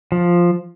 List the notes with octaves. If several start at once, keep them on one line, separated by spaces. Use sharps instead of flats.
F3